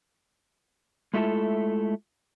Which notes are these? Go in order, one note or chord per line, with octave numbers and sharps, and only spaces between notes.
G#3 A3 E4 F4 A4